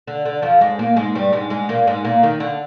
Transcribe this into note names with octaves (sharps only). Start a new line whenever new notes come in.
D3
D3
F2 F3
G#2 G#3
A#2 A#3
G#2 G#3
G2 G3
G#2 G#3
G#2 G#3
A#2 A#3
G#2 G#3
A#2 A#3
D#2 D#3
D3